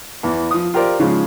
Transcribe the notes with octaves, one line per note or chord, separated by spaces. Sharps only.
E2 E3
F3 D#6
F4 G4 A#4 C5 D5
G#2 C#3 F3 G#3